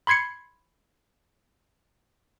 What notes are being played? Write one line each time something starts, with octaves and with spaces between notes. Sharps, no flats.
B5 C6 G#6 C7 C#7